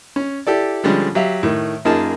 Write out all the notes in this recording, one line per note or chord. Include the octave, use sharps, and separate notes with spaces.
C#4
E4 G4 A4 D5
D3 F3 G3 G#3 C#4
F#3 G4 E5 F5
A2 D#3
F#2 A#3 D#4 F4 G#4 A5